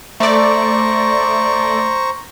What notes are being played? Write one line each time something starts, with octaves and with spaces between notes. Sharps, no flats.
A3 C5 D5 A#5 C#6